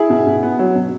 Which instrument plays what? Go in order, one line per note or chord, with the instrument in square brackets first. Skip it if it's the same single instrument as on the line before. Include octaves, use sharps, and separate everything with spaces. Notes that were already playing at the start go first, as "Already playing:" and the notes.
Already playing: [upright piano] E4 G#4
B2
B2
B3
F#3
B2